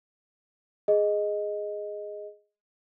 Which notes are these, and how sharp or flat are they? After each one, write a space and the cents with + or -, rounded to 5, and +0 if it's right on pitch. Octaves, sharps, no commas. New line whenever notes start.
G#4 +0 D#5 +0